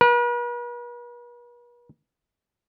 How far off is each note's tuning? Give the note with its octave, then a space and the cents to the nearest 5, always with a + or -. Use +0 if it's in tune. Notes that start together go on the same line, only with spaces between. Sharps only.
B4 -45